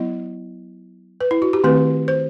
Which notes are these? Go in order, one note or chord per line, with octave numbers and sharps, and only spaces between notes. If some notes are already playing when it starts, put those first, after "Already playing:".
Already playing: F#3 B3 E4 D#5
B4
E4
F#4
G4
D#3 A3 C4 B4
C5